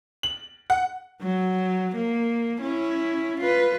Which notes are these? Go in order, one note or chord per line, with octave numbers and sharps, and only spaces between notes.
F#7
F#5
F#3
A#3
C#4 E4
F4 B4